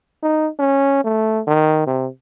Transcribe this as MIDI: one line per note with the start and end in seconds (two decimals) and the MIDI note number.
0.23 0.48 63
0.59 1.03 61
1.04 1.41 57
1.47 1.84 51
1.87 2.08 48